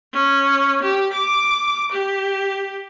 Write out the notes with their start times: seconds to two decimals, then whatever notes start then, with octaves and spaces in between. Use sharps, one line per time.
0.13 C#4
0.83 G4
1.14 D6
1.92 G4